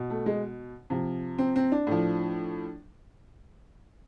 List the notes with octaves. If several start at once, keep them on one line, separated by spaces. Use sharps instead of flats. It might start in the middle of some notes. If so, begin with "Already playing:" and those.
Already playing: B2
A3
G#3
C3 F3
C4
C4
D4
A2 F3